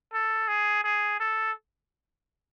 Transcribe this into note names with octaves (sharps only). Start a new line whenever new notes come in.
A4
G#4
G#4
A4